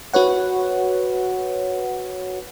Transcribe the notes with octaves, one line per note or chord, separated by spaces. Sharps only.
F#4 B4 C#5 F#5